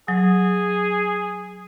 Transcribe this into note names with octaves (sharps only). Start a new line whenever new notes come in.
F#3 G#4